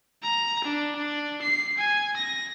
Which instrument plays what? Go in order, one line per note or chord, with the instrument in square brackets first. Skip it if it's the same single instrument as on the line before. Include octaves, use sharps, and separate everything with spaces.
[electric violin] A#5
D4
D4
C7
G#5
A#6